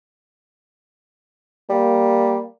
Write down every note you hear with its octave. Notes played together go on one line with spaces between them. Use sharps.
G3 A#3